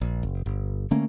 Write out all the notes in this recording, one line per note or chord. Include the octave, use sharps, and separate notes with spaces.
A#1
F#1
G1
D3 A3 A#3 C#4